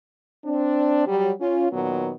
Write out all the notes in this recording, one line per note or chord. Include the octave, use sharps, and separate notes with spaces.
C4 D4
F#3 G3
C#4 F4
A#2 D#3 F#3 B3